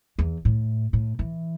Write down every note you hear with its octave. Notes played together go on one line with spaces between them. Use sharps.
E2
A2
A2
E3